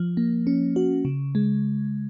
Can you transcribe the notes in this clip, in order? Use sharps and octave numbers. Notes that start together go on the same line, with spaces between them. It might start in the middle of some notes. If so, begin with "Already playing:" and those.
Already playing: F3
A#3
C#4
F#4
C#3
G#3